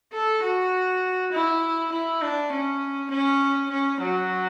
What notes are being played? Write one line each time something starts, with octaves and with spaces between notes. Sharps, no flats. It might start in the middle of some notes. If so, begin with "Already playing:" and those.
A4
F#4
E4
E4
D4
C#4
C#4
C#4
F#3